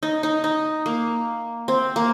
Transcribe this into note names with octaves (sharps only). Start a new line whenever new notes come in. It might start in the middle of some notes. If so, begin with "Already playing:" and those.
D#4
D#4
D#4
A#3
C4
A#3